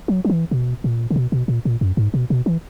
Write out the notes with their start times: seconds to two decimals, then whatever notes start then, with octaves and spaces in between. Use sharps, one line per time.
0.08 F#3
0.25 F#3
0.30 E3
0.51 B2
0.84 A#2
1.11 C#3
1.16 B2
1.32 B2
1.48 A#2
1.65 A#2
1.81 F#2
1.97 G#2
2.14 B2
2.30 B2
2.46 E3